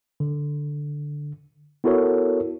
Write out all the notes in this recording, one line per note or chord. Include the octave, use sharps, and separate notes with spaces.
D3
B3 E4 F#4 A4 A#4 C#5